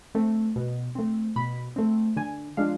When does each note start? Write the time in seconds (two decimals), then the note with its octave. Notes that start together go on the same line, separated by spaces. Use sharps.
0.15 A3 C4
0.56 B2
0.95 A3 C4
1.36 B2 B5
1.76 A3 C4
2.17 D3 G#5
2.57 F3 G#3 D4 F5